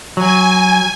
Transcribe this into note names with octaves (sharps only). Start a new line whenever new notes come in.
F#3 G#5